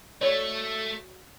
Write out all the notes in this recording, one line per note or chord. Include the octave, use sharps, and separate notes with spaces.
A3 F#4 C#5 D5